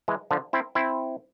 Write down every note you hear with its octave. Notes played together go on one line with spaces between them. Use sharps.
E3 G#3
D3 F3
C4 E4
C4 E4